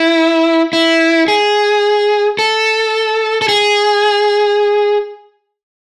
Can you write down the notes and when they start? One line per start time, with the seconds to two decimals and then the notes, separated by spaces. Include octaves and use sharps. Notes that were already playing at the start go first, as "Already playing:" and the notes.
Already playing: E4
0.73 E4
1.28 G#4
2.39 A4
3.42 A4
3.49 G#4